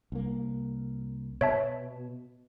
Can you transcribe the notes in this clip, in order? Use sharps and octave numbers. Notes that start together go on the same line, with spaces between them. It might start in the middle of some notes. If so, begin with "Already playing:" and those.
C2 A#3
B2 C#5 E5 A5